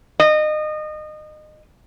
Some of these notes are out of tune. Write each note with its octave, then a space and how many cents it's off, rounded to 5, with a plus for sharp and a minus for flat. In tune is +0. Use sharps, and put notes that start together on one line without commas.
D#5 -25